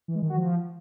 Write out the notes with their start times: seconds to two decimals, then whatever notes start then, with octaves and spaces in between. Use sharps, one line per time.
0.08 E3
0.15 G#3
0.22 D#3
0.30 F#4
0.37 F3